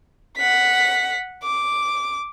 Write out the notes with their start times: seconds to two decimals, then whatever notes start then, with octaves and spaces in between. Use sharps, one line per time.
0.38 F#5 B6
1.43 D6